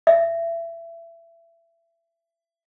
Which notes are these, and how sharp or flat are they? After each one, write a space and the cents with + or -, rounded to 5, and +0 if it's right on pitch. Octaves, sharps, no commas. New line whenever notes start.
E5 +25